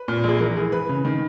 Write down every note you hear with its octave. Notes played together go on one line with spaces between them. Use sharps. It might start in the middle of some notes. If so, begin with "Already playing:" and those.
Already playing: B4
A#2
A#1 G#4
E3 A#4
E3 G#4
E3 B4
C#3
D#3